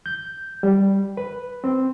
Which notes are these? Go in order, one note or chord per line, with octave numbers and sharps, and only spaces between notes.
G6
G3
B4
C4